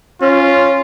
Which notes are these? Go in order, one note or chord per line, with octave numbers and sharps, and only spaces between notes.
C#4 F4